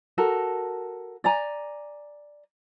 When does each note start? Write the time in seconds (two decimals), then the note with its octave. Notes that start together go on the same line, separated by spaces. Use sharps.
0.18 F#4 A4 A#4
1.24 D5 G#5 A#5